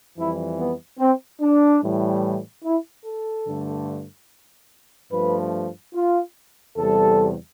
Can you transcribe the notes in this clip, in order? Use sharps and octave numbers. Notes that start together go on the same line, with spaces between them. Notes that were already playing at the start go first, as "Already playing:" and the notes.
F2 E3 G3 E4
B3
C4
D4
A2 E3 G3
E4
A4
G2 D3 A3
G2 F3 A3 B4
F4
E2 C3 G3 A4